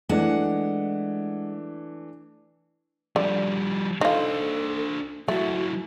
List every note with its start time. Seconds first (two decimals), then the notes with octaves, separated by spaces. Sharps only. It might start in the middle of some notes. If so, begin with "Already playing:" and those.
0.09 E3 G#3 A3 D4 F#5
3.16 D3 F3 G3
4.01 D4 D#4 F4 A4 C5
5.28 F#3 A3 E4 F#4